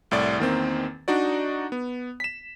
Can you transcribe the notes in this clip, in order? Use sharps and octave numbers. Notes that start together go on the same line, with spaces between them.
C2 A2 D5 A6
E2 D#3 A#3 C4
D4 D#4 F#4 D5
B3
B6 E7